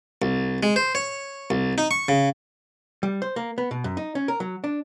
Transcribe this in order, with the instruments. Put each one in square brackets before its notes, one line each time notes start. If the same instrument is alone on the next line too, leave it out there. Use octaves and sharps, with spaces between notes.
[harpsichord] C2
G#3
C5
C#5
C2
D#4
C#6
C#3
[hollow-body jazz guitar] G3
C5
A#3
B3
B2
F#2
D#4
C#4
A#4
F#3
D4